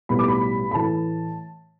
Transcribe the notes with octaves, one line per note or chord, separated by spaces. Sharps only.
B1 A2 G3 B3 B5
D6
B5
B5
A2 E3 A3 A5